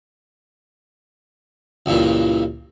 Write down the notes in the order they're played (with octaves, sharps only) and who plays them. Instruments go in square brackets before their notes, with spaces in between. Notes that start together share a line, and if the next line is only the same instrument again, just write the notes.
[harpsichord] C#2 G2 A#2 E3